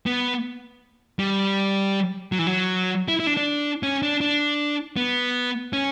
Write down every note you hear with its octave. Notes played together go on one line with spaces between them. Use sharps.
B3
G3
F#3
E3
F#3
E4
E4
D4
D4
C#4
D4
D4
B3
C#4